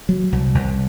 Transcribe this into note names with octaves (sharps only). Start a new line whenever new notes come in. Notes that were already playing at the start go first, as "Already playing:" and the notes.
F#3
C2
C2